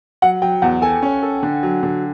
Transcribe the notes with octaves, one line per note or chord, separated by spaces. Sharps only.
F#3 F#5
F#3 G5
E2 F#5
A4 G#5
C#4
A4
D3
F#3
D3